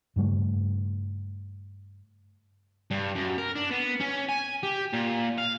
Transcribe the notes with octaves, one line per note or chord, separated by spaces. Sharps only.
G2 C#3 G3 A3
G2
F#2
A#4
D4
B3
C#4
G#5
G4
A#2
F5